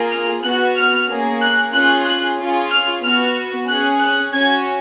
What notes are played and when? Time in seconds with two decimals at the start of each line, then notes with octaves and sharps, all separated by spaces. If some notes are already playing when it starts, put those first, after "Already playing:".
Already playing: A#3 F4 G#4
0.11 F6
0.43 B3 F#4 F#6
0.76 F6
1.08 A#3 C#4 G#4
1.41 F#6
1.73 C#4 F4 G#4 F#6
2.05 F#6
2.38 C#4 F4 G#4
2.70 F6
3.03 B3 F#4 F6
3.68 C#4 G#4 F#6
4.00 F#6
4.33 C#4 F#4 G#6